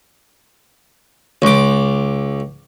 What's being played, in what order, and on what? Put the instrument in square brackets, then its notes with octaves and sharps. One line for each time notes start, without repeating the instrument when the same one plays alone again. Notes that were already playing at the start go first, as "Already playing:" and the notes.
[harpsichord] C#2 D6